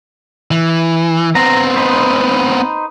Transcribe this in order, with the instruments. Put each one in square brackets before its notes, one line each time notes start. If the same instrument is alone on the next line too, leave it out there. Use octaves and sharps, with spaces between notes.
[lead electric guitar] E3
[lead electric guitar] B3 C4 [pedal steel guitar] A#5
[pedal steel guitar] D#4 B4 C5